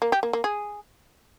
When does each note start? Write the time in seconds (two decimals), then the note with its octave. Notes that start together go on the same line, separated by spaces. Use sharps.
0.02 A#3
0.12 G4
0.23 A#3
0.33 A#3
0.44 G#4